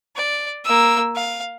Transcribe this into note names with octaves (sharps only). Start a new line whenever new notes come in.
D5
A#3 E6
F5